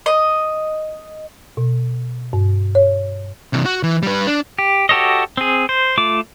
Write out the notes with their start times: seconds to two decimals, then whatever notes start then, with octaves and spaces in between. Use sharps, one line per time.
0.06 D#5
1.57 B2
2.33 G2
2.75 C#5
3.53 C3 E3
3.65 F#4
3.83 E3
4.03 G3 B4
4.27 D4
4.59 G4
4.89 F#4 G4 A4 C#5 D#5
5.37 C4 G#4
5.69 C5
5.98 A3 F4 D6